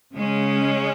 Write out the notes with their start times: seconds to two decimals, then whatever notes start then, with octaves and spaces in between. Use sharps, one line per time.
0.13 C#3 G#3 C#4